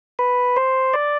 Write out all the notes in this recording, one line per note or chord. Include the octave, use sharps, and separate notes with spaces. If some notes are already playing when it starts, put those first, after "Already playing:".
B4
C5
D5